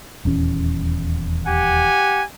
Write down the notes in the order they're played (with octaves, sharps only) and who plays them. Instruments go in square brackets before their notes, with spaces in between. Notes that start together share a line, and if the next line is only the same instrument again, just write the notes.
[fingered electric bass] D#1 E2 C#4
[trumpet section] G4 F#5 G#5